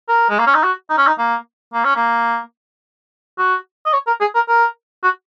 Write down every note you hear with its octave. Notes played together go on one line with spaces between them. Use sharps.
A#4
G#3
A#3
C#4
D#4
F#4
D#4
C#4
D#4
A#3
A#3
C#4
A#3
F#4
D#5
C#5
A#4
G#4
A#4
A#4
F#4